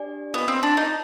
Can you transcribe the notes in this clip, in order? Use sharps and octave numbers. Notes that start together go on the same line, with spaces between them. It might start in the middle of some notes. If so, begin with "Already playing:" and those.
Already playing: D4 G4 D5 G#5
B3 F4 C5 D#5 G5
C4
D4
D#4